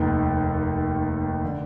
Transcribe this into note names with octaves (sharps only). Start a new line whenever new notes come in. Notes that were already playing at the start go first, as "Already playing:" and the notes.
Already playing: F1 D#2 D#3
D3